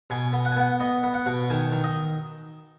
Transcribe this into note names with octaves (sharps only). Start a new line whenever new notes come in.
B2 G#5
B3
F#5
G#5
B3 F#5
B3 D#5
B3
F#5
B2
D#3 G#5
D#3
D#5